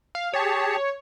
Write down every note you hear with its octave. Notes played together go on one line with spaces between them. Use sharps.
F5
G4 G#4 C#5 A5